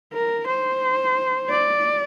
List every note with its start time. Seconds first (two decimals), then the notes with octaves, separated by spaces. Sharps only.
0.13 A#4
0.47 C5
1.50 D5